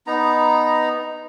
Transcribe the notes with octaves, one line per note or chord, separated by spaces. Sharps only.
B3 D#4 A#5